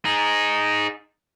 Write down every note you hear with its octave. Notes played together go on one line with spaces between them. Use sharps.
D#4 G#4